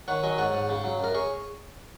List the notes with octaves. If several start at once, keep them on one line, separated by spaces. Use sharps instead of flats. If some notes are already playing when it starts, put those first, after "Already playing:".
D#3 C#5 F#5
F#3 D#5 G#5
G#2 C#5 F#5
G#2
C#3
F#3
F#2 A#4
G#4 C#5